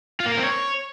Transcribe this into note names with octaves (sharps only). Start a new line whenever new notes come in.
F4
A#3
A#4
C4
C#5